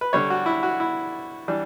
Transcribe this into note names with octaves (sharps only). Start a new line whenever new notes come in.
B4
D3 G3 D4 C#5
F#4
E4
F#4
E4
E3 G3 D4